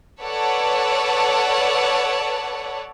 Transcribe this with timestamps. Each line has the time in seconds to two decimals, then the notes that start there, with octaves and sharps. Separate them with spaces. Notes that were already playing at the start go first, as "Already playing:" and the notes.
0.21 A4 B4 C#5 D5 F#5